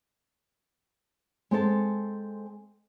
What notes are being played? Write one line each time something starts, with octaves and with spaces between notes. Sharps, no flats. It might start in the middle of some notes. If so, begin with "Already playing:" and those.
G#3 C4 A4 A5